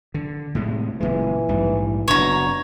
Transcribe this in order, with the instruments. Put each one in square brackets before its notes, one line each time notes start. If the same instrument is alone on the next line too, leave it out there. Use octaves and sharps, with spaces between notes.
[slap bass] D3
A2 C3 G#3
[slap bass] F#1 A#2 G#3 [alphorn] E3
[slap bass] A#1 G#2 G3
[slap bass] F#1 D4 [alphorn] B2 [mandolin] C#5 A#5